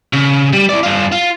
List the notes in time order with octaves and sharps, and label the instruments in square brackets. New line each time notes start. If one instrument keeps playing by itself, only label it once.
[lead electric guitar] C#3
G3
E4 D5
G2 F4
F4